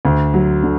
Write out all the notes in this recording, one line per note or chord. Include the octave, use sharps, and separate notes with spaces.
D2
F#3
D3